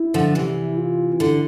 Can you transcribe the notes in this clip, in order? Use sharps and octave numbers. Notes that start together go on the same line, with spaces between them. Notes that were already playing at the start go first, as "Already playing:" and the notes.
Already playing: E4
D3 F3
C3 E3
F4
D3 E4